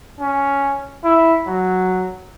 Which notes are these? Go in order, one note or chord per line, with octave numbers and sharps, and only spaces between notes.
C#4
E4
F#3